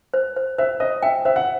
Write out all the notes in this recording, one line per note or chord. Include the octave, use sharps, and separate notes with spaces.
C5
C5
C5 E5
C5 D#5
E5 G5
C5 E5
F#5